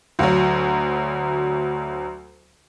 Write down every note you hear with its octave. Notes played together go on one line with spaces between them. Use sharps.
D2 F#3